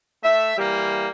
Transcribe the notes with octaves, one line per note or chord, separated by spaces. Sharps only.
A3 E5
E3 G3 A#3